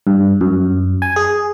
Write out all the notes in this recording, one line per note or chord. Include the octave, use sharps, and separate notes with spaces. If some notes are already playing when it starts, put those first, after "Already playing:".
G2
F#2
G#5
G#4